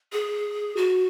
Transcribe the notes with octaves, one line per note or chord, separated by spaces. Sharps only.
G#4
F#4